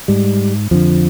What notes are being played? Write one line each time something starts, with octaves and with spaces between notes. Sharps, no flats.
G#2 G3
F2 D3 F3